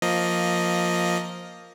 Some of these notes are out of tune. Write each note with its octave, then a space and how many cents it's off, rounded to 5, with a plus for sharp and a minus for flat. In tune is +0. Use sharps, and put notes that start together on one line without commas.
F3 +10 A#3 +0 D#5 +0